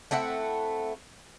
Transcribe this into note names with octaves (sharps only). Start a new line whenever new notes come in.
A3 C4 E4 F#5